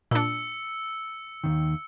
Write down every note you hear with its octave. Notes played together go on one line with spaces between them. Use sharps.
A#2 D4 E6 C#7
D#2 G#2 D#3